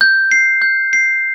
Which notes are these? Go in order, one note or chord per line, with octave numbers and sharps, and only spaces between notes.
G6
C7
G6
C7